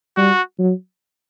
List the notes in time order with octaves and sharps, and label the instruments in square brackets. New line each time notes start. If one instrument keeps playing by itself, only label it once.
[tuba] G3 [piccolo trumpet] F#4
[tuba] F#3